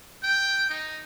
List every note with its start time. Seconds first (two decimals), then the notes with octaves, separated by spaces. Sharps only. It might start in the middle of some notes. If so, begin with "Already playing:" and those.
0.23 G5
0.69 D#4